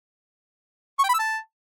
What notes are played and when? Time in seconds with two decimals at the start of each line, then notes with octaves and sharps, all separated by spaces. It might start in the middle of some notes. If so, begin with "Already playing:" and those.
0.99 C#6
1.04 G5
1.09 B5
1.14 E6
1.19 A5